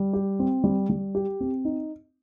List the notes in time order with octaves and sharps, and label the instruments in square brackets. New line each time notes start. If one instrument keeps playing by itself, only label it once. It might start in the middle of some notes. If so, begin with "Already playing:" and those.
Already playing: [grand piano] G3
G4
C4
G3
G3
G4
C4
D#4